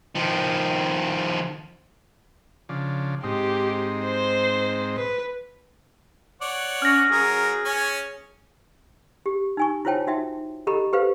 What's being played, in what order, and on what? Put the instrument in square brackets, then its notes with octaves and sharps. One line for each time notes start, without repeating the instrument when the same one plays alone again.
[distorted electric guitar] D#3 F3
[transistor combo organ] C#3 F3 D4
[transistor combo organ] G#2 C4 D#4 [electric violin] G4
[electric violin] C5
B4
[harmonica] C#5 D5 F#5
[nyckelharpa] C#4 [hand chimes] F6 A#6
[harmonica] F#3 A#4 [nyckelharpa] G#4
[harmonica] C#4 C#5 G#5
[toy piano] G4
D#4 G#5 C#6
E4 F4 C5 C#5 G5 A5
D#4 F#4 E5 G5
G4 A4 D#5 A#5 B5
G4 B4 C5 F5